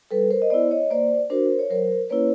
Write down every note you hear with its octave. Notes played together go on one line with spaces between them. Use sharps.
G3 A4 B4
A#4 C5
D#5
B3 E4 C5 D5
C#5 D#5
A#3 C5 D5
D4 F#4 A#4 C5
C#5
F#3 A#4 C5
A#3 C#4 E4 B4 C#5